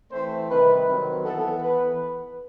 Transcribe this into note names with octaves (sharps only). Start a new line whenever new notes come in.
E3 A3 C4 C5
C3 D#3 G3 B4
D#3 F#3 C4
E3 B3 A4
E3 B3 B4